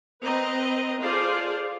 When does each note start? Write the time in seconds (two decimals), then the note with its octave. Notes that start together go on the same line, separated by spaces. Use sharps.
0.22 C4 B4 D#5 A#5
1.02 F4 G#4 A4 C5 D5 F5